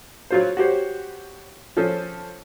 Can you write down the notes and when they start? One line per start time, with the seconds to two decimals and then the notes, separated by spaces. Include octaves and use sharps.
0.31 F#3 F4 C5
0.57 F#4 G4 C5 C#5
1.77 F3 C#4 A4 C5